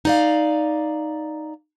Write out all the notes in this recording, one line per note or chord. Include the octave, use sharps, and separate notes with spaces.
D#4 D5 F5